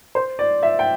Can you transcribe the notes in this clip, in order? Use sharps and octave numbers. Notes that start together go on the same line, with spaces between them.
C5
D5
E5
G5